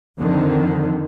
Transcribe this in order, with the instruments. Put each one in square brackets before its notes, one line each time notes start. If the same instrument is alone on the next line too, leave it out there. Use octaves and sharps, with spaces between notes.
[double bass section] F2 D3 D#3